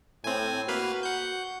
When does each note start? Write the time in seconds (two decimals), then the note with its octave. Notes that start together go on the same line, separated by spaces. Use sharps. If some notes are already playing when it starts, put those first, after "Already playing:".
0.24 A2 C4 G#5
0.68 A#3 F#4 B4 F5
1.03 F#5 G6